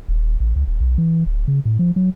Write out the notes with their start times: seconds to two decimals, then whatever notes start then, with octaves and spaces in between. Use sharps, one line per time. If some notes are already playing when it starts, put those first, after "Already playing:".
0.08 D#1
0.40 A1
0.56 C#2
0.67 D#1
0.80 B1
0.98 E3
1.26 D1
1.48 C#3
1.65 A2
1.79 F3
1.96 F#3